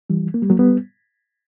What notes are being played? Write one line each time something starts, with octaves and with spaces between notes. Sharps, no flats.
E3 G3
A#3
G3
F#3 A#3
G3 B3